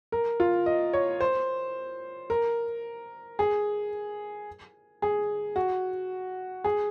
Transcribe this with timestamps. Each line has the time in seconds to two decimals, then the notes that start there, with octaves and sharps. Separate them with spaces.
0.12 A#4
0.40 F4
0.66 D#5
0.93 C#5
1.20 C5
2.30 A#4
3.39 G#4
5.02 G#4
5.56 F#4
6.64 G#4